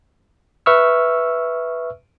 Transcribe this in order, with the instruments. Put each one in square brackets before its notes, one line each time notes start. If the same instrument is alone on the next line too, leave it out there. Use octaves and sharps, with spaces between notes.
[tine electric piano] B4 E5 C#6 E6 F6